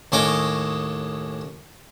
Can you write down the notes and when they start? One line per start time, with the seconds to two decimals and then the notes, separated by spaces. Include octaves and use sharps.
0.12 D#2 A2 C#4 D#5 D6